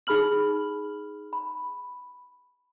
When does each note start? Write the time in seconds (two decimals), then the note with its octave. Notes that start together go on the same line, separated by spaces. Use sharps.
0.07 D#4 G#4 B5 F6 F#7
1.33 B5